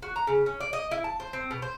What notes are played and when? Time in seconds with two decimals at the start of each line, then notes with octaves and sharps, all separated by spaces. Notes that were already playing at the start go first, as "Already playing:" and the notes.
0.03 F#4
0.16 A#5
0.27 C#3
0.46 C#4
0.60 D5
0.73 D#5
0.91 E4
1.04 A5
1.20 C5
1.33 C4
1.51 B2
1.62 C5